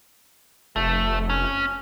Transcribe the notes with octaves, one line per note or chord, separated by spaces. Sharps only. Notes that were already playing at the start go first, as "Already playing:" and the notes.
F1 A3
C#4